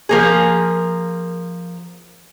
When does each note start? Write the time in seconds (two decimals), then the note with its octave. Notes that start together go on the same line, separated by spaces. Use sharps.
0.09 F3 A#3 G#4